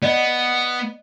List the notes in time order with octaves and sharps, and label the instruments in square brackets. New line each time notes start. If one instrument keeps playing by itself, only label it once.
[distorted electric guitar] B3 [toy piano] D5 D#5